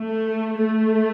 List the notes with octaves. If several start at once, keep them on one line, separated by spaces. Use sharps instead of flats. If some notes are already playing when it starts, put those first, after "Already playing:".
Already playing: A3
A3